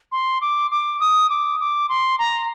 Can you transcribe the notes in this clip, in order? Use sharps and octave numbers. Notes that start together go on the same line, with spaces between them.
C6
D6
D6
D#6
D6
D6
C6
A#5